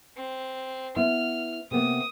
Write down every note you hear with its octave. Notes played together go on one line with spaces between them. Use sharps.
C4
B3 E4 F6
C3 A#3 B3 D#6